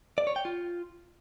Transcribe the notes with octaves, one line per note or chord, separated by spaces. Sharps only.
D5
C#5
G5
F4